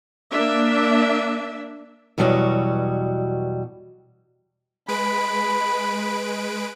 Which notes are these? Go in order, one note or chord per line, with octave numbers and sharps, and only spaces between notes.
A#3 D4 E5
E2 B2 F#3 G3 F#4 D#5
G#3 B4 B5 D7